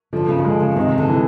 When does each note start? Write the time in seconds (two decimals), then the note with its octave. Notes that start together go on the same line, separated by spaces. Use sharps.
0.13 D3 F3
0.28 C#3
0.39 D#3
0.44 D3 G#3
0.60 C#3
0.71 E3
0.76 C3 D#3
0.98 D3
1.09 E3